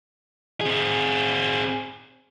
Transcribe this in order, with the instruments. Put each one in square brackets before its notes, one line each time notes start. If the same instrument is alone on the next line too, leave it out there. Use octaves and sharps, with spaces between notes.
[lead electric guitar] C4 G#4